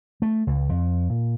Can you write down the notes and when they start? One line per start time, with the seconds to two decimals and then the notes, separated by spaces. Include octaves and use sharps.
0.22 A3
0.47 C#2
0.69 F2
1.10 A#2